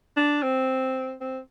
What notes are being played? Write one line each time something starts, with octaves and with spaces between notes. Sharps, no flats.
D4
C4
C4